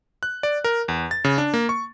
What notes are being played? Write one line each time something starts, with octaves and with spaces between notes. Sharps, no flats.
F#6
D5
A#4
E2
A6
C#3
D4
A#3
C#6